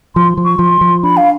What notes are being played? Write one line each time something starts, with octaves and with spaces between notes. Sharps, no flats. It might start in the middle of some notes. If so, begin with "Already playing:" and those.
F3 C6
F3
C#6
F3 C6
F3
D4 B5
F5